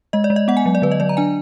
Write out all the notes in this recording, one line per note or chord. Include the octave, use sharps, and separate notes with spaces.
G#3 D#5
D5
G#3
D#5
B3 F#5
G#5
F#3
D5
D3 B4
D#5
F#3 D5
A#5
D4 G#5